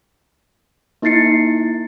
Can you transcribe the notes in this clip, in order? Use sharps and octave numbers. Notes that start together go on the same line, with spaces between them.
A#3 D#4 E4 A6 C7 C#7